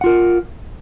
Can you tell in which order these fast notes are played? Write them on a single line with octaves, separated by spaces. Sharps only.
F#5 F4 A#4